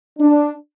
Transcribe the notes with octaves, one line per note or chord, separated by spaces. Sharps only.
D4